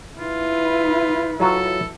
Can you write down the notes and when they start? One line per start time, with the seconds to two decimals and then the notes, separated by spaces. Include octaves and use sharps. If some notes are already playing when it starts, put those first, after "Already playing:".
0.19 E4 F4 B4
1.40 F#3 F4 F#4 A4